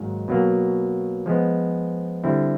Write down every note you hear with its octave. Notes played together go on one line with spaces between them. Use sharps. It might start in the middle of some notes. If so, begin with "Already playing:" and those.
Already playing: G#2 D#3 F#3 A#3
B2 F#3 A#3
F3 G#3 B3
D3 G3 C4 E4